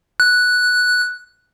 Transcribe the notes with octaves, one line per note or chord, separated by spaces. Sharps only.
F#6